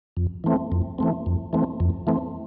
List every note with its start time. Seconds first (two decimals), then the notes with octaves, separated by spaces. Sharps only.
0.17 F2
0.44 E3 A3 C4
0.72 F2
0.99 E3 A3 C4
1.26 F2
1.53 E3 A3 C4
1.80 F2
2.07 E3 A3 C4